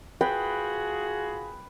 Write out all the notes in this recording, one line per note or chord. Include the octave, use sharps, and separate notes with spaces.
F4 F#4 G#4 B4 G5